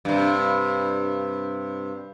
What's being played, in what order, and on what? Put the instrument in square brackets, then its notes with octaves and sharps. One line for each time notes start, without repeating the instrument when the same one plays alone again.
[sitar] G2 C3